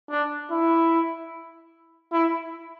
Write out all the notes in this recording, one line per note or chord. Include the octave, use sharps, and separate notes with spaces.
D4
E4
E4